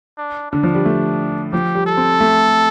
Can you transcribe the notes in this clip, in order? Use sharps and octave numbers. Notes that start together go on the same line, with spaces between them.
D4
D3 D4
F3
G3
A3
F3 G4
G3
A4
C4
A3